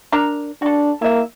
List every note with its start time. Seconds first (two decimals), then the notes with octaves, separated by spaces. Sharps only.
0.12 D4 A#4 A#5
0.62 D4 F#4 A4
1.02 A#3 E4 E5